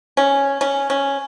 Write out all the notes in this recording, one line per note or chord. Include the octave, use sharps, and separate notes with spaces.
C#4
C#4
C#4